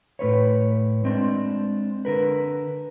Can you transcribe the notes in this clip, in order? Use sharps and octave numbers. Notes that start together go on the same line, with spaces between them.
A2 C#4 B4 C#5
G#3 C4 D4
D3 A#4 B4